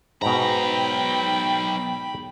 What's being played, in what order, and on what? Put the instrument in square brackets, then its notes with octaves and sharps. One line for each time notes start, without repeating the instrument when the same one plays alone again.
[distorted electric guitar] B1 A#5 [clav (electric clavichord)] G#2 B2 [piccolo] G5 [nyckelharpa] B5